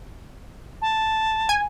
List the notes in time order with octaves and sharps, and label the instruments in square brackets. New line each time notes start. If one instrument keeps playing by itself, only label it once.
[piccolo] A5
[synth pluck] G#5